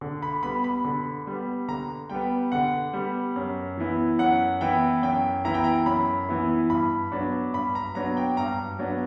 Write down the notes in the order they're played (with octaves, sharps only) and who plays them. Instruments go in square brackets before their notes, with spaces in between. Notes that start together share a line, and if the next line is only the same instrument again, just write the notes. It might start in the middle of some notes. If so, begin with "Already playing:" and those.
[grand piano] D3
B5
G3 B3 B5
B5
D3
G3 B3
D3 A#5
G3 B3 G5
D3 F#5
G3 B3
F#2
E3 B3 E4
F#2 F#5
E3 B3 E4 G5
F#2 G5
E3 B3 E4 A#5
G5
A#5
F#2 B5
E3 B3 E4
G2 B5
F#3 B3 D4
G2 B5
A#5
F#3 B3 D4 A#5
G5
G2 A#5
F#3 B3 D4